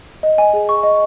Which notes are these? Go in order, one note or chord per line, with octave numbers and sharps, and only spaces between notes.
D#5
G#5
G#4
C#6
D#5